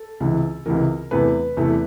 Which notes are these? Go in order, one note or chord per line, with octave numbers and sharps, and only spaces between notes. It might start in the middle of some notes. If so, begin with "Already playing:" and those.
Already playing: A4
C#2 C3 E3
C#2 C3 E3 A#4
E2 C3 E3 A3 B4
E2 C3 E3 A3